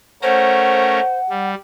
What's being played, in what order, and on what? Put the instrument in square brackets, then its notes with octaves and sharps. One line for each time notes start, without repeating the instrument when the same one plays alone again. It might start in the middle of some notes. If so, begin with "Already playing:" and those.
[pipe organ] A3 C#4 A#4 [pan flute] C5 [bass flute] F#5
[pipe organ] G3